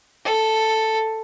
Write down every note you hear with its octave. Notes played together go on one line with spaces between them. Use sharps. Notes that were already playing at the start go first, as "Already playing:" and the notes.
A4